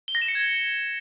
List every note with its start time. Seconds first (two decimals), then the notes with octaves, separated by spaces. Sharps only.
0.08 G7
0.15 A#6
0.22 E7
0.28 C#7
0.35 G#6